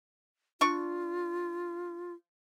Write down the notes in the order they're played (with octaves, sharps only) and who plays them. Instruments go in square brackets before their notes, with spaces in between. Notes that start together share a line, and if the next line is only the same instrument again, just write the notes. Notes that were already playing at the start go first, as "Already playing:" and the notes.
[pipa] D4 C#6 [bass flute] F4